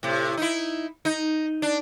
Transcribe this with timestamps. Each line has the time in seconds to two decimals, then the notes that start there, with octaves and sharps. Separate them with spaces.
0.03 A2 C3
0.37 D#4 E4
1.05 D#4
1.62 D4